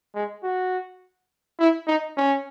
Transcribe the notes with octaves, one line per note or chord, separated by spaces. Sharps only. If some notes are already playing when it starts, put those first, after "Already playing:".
G#3
F#4
E4
D#4
C#4